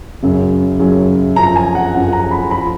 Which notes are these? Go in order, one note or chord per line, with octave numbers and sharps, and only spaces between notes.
F#2 C#3 F#3
F#2 C#3 F#3
F#2 F3 A#5
G#5
F#5
F#2 F3 F#5
A#5
B5
F3 B5